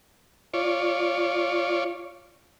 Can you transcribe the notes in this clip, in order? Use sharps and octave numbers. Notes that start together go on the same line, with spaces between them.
F4 C#5 D5